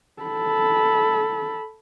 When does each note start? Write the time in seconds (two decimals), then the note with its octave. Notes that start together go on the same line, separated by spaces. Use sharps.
0.22 A4 B5